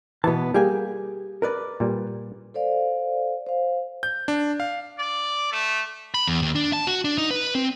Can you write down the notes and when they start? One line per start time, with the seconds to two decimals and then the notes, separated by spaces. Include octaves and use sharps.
0.24 B2 E3 B3 A5
0.54 G3 A#3 G4 G#4 G#5
1.42 A#4 B4 D5
1.80 A#2 G3
2.54 A4 C5 D5 F5
3.46 C5 F5
4.03 G6
4.28 D4
4.60 F5
4.99 D5
5.52 A3
6.14 B5
6.27 E2
6.42 D#2
6.55 D4
6.73 A5
6.87 F#4
7.05 D4
7.18 D#4
7.31 B4
7.55 C4